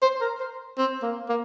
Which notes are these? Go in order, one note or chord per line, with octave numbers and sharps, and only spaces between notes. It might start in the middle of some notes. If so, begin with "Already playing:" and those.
C5
A#4
C5
C4
A#3
A#3